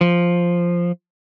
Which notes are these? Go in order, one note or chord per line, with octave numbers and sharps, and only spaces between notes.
F3